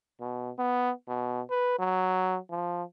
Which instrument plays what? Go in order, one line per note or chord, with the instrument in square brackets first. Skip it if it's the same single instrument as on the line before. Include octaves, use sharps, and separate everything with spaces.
[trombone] B2
B3
B2
B4
F#3
F3